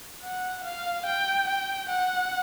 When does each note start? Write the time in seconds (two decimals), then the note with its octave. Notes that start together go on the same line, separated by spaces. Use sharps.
0.23 F#5
0.64 F5
1.06 G5
1.48 G5
1.89 F#5